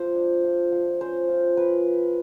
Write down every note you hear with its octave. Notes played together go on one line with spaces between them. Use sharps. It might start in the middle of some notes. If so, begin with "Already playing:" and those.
Already playing: F3 A3 F4 C5
D4
F4
F3
C#4 C5
F4
F3 B4